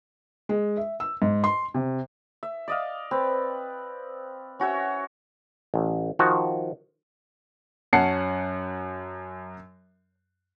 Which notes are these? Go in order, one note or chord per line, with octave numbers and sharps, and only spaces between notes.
G#3
E5
E6
G#2
C6
C3
E5
D5 D#5 F5
C4 B4
C#4 F#4 C#5 E5
A1
D#3 F3 F#4
F#2 C#4 F#5 A5 C7 C#7